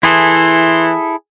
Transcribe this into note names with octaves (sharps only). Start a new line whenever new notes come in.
E3 E4 G#4 A4 C6